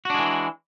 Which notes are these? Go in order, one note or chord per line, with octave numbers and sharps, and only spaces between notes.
E3 G#3 D4 F#4